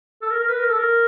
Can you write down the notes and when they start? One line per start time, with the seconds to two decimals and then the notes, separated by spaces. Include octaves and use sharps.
0.22 A4
0.30 A#4
0.40 A#4
0.49 B4
0.59 A#4
0.69 A4
0.79 A#4